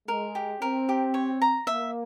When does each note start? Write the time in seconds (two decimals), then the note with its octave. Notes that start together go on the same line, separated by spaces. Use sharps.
0.08 G#3 A#4
0.35 G4
0.61 C4 A#4
0.89 G4
1.14 C#5
1.42 A#5
1.67 A#3 E5